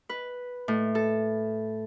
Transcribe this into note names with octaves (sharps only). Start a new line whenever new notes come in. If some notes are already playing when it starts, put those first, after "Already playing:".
B4
A2
A4